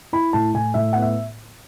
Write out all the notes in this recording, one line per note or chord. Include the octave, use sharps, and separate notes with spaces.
E4 B5
A2 A5
A2 G#5
A2 E5
B3 F#5
E5